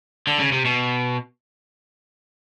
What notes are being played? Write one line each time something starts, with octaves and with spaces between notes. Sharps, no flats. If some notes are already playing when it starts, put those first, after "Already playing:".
D3
C#3
C3
B2